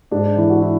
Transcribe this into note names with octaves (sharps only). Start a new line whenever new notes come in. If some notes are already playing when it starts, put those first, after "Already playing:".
G#2 D4
E3 E4
F#4
E4